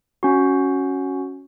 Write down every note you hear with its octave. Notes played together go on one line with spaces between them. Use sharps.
C#4 F#4